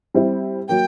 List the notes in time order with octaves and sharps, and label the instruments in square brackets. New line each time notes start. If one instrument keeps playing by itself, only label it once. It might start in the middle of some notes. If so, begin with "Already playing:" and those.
[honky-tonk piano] G3 C4 E4
[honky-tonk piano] F#3 A#3 [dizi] G5